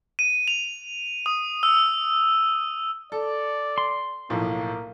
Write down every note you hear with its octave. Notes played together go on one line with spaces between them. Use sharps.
D#7
F7
D#6
E6
A4 D5
C6
B1 A2 F3 A#3